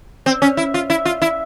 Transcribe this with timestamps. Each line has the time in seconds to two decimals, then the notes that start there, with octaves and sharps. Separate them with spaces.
0.26 C4
0.42 C#4
0.57 E4
0.74 F4
0.90 E4
1.05 F4
1.22 E4